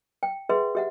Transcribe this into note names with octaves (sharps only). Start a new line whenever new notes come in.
G5
G#4 B4 E5 F#5 C6
G4 E5 F#5